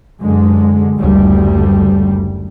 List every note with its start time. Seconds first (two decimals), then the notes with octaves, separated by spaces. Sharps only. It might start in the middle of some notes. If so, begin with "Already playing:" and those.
0.20 F#2 D3 G#3
0.97 F#1 D2 G3